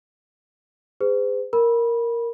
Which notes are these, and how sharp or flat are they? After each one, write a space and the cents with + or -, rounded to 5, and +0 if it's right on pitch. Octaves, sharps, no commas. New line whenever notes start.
G#4 -25 C5 -45
A#4 +0 B5 -20